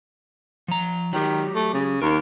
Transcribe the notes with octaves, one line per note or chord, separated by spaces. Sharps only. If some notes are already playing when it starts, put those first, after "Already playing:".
F3 A#5
D#3 F#3 G4
A3
C#3
D#2 A#4